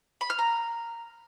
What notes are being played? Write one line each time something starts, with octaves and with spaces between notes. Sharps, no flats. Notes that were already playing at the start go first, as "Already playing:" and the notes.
B5
F6
A#5